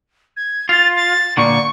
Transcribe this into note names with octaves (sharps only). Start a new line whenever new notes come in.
G#6
F4 A6
A6
A#2 D3 C#6